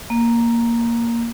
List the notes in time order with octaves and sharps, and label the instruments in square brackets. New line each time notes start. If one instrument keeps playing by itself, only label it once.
[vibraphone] A#3